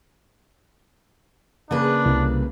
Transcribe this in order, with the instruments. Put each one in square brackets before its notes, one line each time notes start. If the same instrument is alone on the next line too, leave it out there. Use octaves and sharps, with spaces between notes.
[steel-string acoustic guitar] C#3 A#3 B4 [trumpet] D4
[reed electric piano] C2